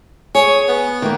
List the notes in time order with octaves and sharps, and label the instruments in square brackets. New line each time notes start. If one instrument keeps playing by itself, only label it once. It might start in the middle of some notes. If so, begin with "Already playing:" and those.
[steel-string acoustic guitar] G#4 [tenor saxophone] C#5
[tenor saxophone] B3
[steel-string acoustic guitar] D#3 A#3